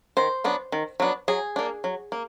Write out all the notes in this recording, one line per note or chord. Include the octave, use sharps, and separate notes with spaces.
D#3 C5
F#3 B3 D4
D#3
F#3 B3 D4
F#3 G#4
A#3 D4
F#3
A#3